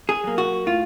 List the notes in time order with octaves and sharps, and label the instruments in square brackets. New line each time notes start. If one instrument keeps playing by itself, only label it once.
[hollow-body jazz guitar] G#4
F#3 A#3
F#4
A2 F4